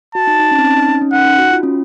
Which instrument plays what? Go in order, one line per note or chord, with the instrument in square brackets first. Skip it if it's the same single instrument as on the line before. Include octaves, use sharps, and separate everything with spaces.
[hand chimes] F#4 [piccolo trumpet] A5
[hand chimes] D#4
D#4
C#4
C4
C#4
D#4
C#4
C#4
[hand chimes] D#4 [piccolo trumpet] F#5
[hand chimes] D#4
F#4
F4
C#4